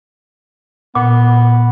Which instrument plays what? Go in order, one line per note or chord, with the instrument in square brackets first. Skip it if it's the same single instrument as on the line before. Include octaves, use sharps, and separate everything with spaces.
[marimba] A#2 [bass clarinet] B3